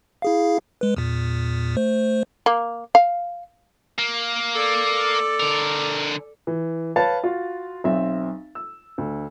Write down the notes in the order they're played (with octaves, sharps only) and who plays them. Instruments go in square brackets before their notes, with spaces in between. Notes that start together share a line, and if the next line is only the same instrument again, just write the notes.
[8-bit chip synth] E4 G#4 F5
G#3 B4
E2 A#2
A3 C5
[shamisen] A#3
F5
[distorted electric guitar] A#3
[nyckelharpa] A4 D5
[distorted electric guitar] D3 A#4
[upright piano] E3
B4 C#5 F5 A5 A6
F4 F#4
B1 C4 E5
E6
D2